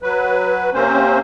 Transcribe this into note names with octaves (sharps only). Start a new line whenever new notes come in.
F#3 B4
C3 A#3 C4 C#4 C5